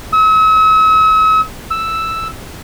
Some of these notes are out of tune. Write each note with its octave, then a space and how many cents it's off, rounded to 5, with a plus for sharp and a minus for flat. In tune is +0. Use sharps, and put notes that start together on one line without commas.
E6 -45
E6 +0